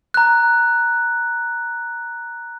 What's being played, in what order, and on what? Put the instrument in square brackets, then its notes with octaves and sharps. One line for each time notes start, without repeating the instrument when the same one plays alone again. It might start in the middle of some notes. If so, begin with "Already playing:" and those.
[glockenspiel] A#5 F#6